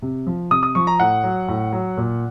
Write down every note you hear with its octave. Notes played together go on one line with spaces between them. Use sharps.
C3
F3
C3 D#6
D#6
F3 C#6
A#5
A2 F#5
F#3
A2
F#3
A#2